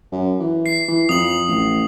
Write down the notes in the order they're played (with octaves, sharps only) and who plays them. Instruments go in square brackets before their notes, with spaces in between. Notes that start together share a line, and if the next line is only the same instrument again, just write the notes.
[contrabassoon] F#2
E3
[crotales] C7
[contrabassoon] E3
[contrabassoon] F2 [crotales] D#6 F#7
[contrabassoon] A1